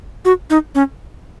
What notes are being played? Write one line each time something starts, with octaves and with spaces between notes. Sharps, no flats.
F#4
D#4
C#4